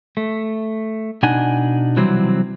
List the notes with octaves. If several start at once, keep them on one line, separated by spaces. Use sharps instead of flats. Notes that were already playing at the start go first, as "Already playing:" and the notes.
A3
B2 D4 D#4 F#5 G#5
C3 E3 F#3 G3 C4